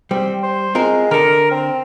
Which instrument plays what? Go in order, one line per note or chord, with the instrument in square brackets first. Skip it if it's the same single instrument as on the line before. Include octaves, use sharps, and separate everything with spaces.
[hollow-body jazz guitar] G3 [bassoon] C4
[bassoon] C5
[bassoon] G#3 [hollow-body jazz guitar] C4 F4 A#4
[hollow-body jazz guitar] D3 A4 [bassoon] A#4
[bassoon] C4